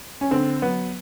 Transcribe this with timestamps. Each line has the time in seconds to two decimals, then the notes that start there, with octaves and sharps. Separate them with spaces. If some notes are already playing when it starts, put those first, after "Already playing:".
0.21 C#4
0.31 D3 C4
0.62 F#3 B3